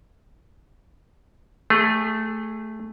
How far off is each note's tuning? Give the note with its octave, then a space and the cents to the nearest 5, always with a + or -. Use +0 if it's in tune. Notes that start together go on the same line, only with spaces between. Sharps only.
A3 +0 G#4 -25